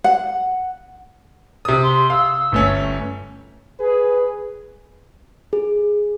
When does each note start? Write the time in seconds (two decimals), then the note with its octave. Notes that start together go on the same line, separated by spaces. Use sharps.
0.04 F#5
1.65 C3 D#6
1.82 C6
2.10 F5 E6
2.52 G1 A3 C#4
3.79 G#4 B4
5.53 G#4